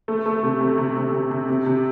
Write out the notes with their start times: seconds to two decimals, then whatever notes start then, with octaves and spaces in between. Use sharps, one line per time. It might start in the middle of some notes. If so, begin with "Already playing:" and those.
0.08 A3
0.26 A3
0.43 C3
0.61 C3
0.78 C3
0.96 C3
1.13 C3
1.31 C3
1.49 C3
1.66 C3